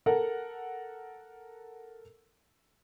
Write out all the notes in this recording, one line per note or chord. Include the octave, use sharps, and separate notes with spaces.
A4 A#4 F#5